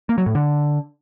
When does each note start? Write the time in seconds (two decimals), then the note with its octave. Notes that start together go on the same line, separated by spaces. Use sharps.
0.09 A#3
0.18 F#3
0.26 A2
0.35 D3